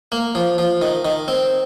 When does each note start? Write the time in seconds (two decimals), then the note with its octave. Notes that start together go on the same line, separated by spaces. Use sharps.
0.12 A#3
0.35 F3
0.58 F3
0.82 D#3
1.05 D#3
1.28 C4